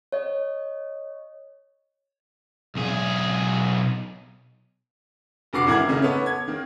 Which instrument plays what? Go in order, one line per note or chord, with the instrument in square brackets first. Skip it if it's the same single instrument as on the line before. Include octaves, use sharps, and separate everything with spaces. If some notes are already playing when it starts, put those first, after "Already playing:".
[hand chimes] C#5 D#5
[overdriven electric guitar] B1 G#4
[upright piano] F1 D3 F#4 D6 C7
G#1 E3 A#4 G#6
C#3 A3 D#4
B3 A4 C#5
G#6
D#3 A#3